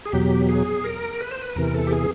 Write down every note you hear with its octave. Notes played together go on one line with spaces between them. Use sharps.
G#4
E2 B2 F#3 G4
G#4
A#4
B4
C5
B4
E2 C3 E3 A#4
A4
G4
G#4